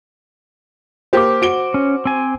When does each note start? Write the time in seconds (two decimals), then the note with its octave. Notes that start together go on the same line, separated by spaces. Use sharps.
1.13 A#3 G4 C5 D6
1.42 F#4 D7 G7
1.74 C#4
2.05 C4 G#5